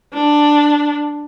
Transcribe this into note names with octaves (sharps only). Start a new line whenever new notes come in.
D4